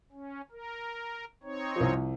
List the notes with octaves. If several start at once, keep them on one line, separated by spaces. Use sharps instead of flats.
C#4
A#4
C4 D#4 C#5
C2 F3